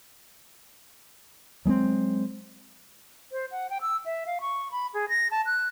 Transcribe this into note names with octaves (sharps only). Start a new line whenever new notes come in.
F#3 G#3 A#3 C4
C5
F#5
G5
E6
E5
F5
C#6
B5
G#4
A#6
A5
F#6